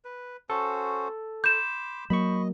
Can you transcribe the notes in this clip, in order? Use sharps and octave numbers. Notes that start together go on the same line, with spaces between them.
B4
C#4 F#4 A4 C5
B5 C6 D6 G6 E7
F#3 A#3 D#5 B5 C#6